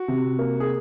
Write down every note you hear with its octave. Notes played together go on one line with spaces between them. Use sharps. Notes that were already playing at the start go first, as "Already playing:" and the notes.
Already playing: F#4
C3
A#3
G#4